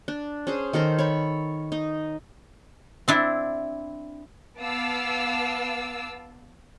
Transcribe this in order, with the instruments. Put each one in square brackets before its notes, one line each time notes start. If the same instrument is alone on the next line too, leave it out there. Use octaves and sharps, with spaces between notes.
[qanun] D4
C#4 G#4 C5
D#3 A4 A#4 C5
C#5 B5
D#4
[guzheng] C4 D4 E4
[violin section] B3 F5 A5 D6 E6